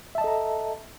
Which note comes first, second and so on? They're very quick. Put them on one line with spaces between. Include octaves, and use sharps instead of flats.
E5 A5 D#5 A4 A#5